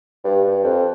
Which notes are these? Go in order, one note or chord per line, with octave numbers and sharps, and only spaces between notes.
G2
G2
F2